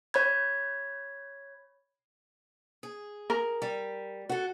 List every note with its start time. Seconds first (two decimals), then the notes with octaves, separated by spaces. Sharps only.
0.14 C#5 B5 G#6
2.83 G#4
3.30 A#4
3.62 G3
4.29 F#4 A4